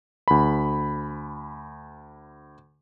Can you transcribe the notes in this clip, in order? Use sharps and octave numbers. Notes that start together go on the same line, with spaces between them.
D2 B5